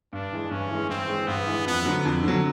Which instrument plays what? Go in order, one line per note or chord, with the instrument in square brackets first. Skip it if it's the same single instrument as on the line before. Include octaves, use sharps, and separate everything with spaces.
[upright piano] G2 [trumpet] D4
[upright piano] E3 G#3
[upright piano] G2 [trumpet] C#4
[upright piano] E3 G#3
[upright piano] G2 [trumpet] C4
[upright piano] E3 G#3
[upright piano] G2 [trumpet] B3
[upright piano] E3 G#3
[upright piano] F2 [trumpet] B3
[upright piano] D3 F#3
F2
D3 F#3